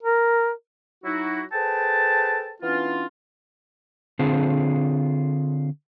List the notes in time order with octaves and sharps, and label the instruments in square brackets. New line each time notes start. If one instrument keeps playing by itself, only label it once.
[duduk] A#4
[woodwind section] F#3 D#4 E4 F#4
G#4 A4 B4 C5 G5 A5
E3 B3 C#4 D4 F4
[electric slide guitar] D3 C4 D4 F4 G#4 A5